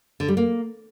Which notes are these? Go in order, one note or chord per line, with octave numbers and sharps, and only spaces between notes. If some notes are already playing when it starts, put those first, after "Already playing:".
D3
G3
A#3